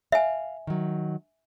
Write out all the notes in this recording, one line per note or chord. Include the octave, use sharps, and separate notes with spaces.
E5 F5 G#5
D#3 F#3